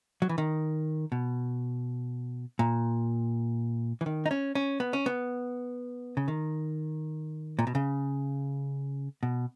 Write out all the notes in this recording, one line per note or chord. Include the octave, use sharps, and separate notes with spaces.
F#3
E3
D#3
B2
A#2
E3
D#3
D#4
C#4
C#4
B3
C#4
B3
C#3
D#3
A#2
B2
C#3
B2